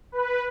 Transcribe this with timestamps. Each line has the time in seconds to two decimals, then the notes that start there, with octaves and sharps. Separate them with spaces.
0.12 B4